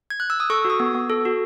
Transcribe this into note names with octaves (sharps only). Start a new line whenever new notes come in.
G#6
F#6
E6
D#6
A4 C#6
F#4
D#6
B3
B3
A4
F#4